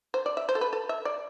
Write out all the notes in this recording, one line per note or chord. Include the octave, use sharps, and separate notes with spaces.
C5
D5
E5
C5
A4
B4
A4
E5
D5